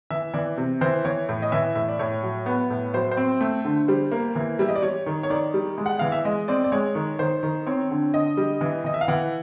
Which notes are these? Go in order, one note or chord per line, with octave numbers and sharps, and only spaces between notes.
E3 E5
E3 D5
C3
E3 C5
E3 C#5
A2
D#5
E3 E5
A2 E5
D5
A2 C#5
F#3
B3
A2
F#3 C5
C5
C4
A3
D3
G3 C5
A#3
E3
G3 E5
D#5
D5
G3 C#5
D#3
C#5
D#3 D5
G3
G#3
F#5
E3 F5
E5
G#3 D#5
C4 D5
D5
G#3 C#5
D#3
D#3 C5
D#3
C4 C#5
D3
D3 D#5
G3
E3
E3 D#5
E5
F5
E3 F#5